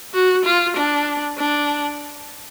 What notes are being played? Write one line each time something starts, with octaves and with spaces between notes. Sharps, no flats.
F#4
F4
D4
D4